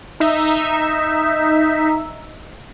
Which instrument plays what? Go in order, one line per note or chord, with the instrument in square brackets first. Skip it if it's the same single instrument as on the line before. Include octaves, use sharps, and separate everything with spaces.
[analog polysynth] D#4 E5